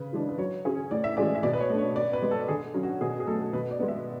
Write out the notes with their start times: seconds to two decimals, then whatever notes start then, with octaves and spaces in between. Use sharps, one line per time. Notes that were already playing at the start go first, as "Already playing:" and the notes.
Already playing: C#3 B4
0.13 E3 G#3 D4
0.29 B4
0.38 F#3 C#5
0.65 C#4 G#4
0.91 A2 D5
1.04 E5
1.17 E3 G#3 C#4 G#4 D5
1.35 E5
1.43 B2 D5
1.53 B4
1.60 C#5
1.70 A3 D4
1.78 C#5
1.96 B2 D5
2.13 B4
2.22 G#3 B3
2.31 A4
2.48 D3 G#4
2.74 F#3 C#4
2.83 F#4
3.01 B2 G#4
3.20 G#4
3.27 F#3 A3 A4
3.53 B2 B4
3.71 D5
3.79 G#3 B3
3.88 E5